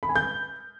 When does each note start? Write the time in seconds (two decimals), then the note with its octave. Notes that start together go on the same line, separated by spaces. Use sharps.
0.03 B5
0.09 G#5
0.16 G6